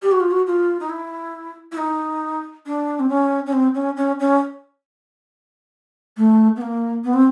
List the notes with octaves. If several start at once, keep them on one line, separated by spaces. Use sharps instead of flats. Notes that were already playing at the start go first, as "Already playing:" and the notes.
G4
F#4
F4
F#4
F4
D#4
E4
E4
D#4
D4
C4
C#4
C#4
C4
C#4
C#4
C#4
A3
B3
A#3
B3
C4